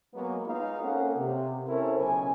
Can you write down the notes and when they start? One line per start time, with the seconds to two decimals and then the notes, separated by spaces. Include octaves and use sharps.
0.14 F#3 G#3 A#3 B3
0.45 G#3 B3 D#4 F4 B4 F5
0.80 A#3 C4 C#4 A4 A#4 F#5
1.16 C3
1.68 C#4 E4 A4 A#4 C5
1.98 B1 C#3 G#5